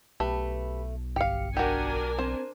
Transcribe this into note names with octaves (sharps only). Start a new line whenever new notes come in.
B1 A3 G4 B4 B5
G1 G4 F5 C#7
D4 F#4 G4 A#4 G#5
C4 C5